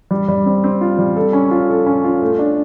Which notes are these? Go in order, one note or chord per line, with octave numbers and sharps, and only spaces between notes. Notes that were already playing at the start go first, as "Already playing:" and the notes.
G3
G3
C4
C4
F4
G3
A4
C#4
F4
A4
C#4
F4
A3
D4